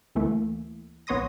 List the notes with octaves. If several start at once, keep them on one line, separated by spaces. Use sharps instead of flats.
D2 E3 A3 A#3
A#1 B3 C#5 C6 D#6 A#6